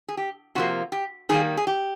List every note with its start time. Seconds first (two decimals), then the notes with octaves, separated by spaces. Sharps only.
0.08 G#4
0.17 G4
0.55 C3 F3 A#3 F#4
0.92 G4
1.29 D#3 G3 A#3 G#4
1.57 G#4
1.67 G4